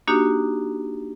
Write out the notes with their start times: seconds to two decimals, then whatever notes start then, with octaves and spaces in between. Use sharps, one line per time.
0.07 A#3 D4 D#4 F#4 G4